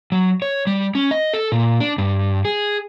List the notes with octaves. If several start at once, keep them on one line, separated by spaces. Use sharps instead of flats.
F#3
C#5
G3
C#4
D#5
A4
A#2
D4
G2
G#4